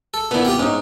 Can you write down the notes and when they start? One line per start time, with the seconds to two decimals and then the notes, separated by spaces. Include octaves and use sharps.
0.14 A4
0.31 A#2 D3 B3 E4
0.45 C4 F4 G4
0.59 G#2 C#4 D#4